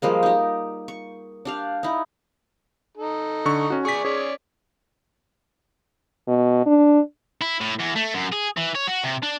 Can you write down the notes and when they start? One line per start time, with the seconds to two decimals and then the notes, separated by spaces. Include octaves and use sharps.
0.02 F3 G3 G#3 A#3
0.23 D#4 G4
0.88 C#6
1.45 D4 G4 F5
1.83 D#4 E4
2.97 D#4 A4
3.45 D3 C#6
3.70 C#4 F#4
3.85 G#4 D5 G#5 C#6 B6
4.05 C#4 G#4 D5
6.28 B2
6.66 D4
7.41 E4
7.61 A2
7.79 E2
7.96 A3
8.15 F#2
8.33 G#4
8.57 E3
8.75 C#5
8.87 F#4
9.04 C3
9.23 D4